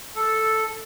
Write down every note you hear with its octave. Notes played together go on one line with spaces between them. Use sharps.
A4